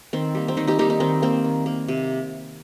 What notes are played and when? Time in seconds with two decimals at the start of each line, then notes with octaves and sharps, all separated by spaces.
0.13 D#3 C4
0.35 G3 A#3
0.48 C4
0.57 D#3 D#4
0.67 D#4 G4
0.79 G3 A#3 D#4 G4
0.90 D#4
1.00 D#3 C4
1.22 A#3 C4
1.44 D#3
1.66 A#3
1.88 C3